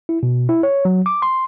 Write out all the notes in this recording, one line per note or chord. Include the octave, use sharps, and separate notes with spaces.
E4
B2
E4
C#5
F#3
D6
C6